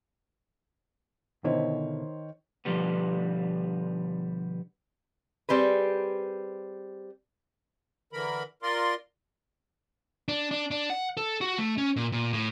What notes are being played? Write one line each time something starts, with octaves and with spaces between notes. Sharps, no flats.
B2 D3 D#3 E4 C5 C#5
B2 D3 E3 F3 G3 B3
G3 C4 G#4 B4
D3 E3 A#4 B5
F4 A#4 D5 C6
D4
D4
D4
F#5
A4
F#4
A3
C#4
A#2
A#2
A2